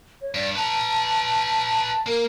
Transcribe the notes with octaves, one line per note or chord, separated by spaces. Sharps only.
C#5
G2 D5
B4 A5 A#5
A#3 A#4